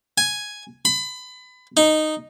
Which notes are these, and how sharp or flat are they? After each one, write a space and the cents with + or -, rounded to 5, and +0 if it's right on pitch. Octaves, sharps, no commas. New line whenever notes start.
G#5 +5
B5 +30
D#4 -5